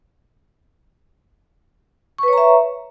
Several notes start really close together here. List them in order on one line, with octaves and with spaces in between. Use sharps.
C#6 B4 C#5 A#5 E5